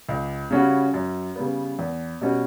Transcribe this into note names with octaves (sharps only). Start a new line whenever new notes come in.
C#2
C#3 G3 C#4 F#4
F#2
C#3 G3 B3
E2
B2 G3 C#4 F#4